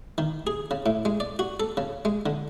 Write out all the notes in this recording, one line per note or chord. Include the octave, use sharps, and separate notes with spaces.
D#3
G#4
C#3
A2
G#3
D5
F#4
A4
C#3
G#3
D3